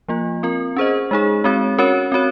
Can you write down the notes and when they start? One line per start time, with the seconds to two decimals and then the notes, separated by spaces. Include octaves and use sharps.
0.08 F3 A#3 F4
0.43 C4 F4 A#4
0.77 C#4 G#4 C5 D#5
1.11 G#3 D#4 G#4
1.44 G#3 C4 F#4 C#5
1.78 C#4 F#4 A#4 C#5
2.12 C4 F#4 C#5